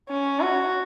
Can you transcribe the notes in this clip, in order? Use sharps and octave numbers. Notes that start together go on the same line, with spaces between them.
C#4
F#4